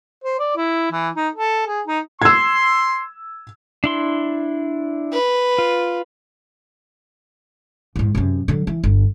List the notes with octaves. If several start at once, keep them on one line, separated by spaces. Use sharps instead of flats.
C5
D5
E4
E3
D#4
A4
G#4
D#4
C6 E6 G#6
D4 E4 C6
B4
F4
E2 G#2
F#2 C3
D3 F#3
E3
G1